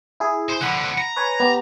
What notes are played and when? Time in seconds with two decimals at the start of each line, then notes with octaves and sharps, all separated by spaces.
0.20 E4 G#4
0.49 C5
0.61 D3 F3 F#5 B5
0.98 A#5
1.16 B4 C#5 G#5
1.40 B3 G4